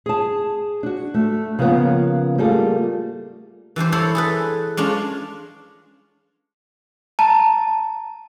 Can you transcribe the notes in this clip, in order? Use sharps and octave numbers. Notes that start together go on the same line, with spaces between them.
G#4 A5
D4 F#4
A3
C#3 F3 G3 A#3 B3 C#4
G3 A3 A#3 F4 G#4 A4
E3 G3 D4 C5
E4 A4 C5 C#5
G#4 A4 B4
G#3 C#4 D4 F4
A5 A#5